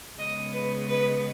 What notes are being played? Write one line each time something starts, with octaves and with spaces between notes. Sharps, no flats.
C#3 G#3 B3 D#5
B4
B4